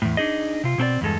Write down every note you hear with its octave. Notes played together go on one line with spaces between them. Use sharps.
E2 A2
D4 D#4 G#4 D#5
C3 F4
B2 C4 A4 D5
E2 G2 G#3 A4